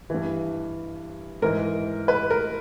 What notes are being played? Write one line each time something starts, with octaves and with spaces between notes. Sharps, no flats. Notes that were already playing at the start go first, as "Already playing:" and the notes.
G2 E3
G#2 E3 A#4
B4
A#4